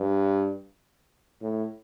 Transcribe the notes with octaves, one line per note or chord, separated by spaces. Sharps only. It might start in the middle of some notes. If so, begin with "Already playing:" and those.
Already playing: G2
A2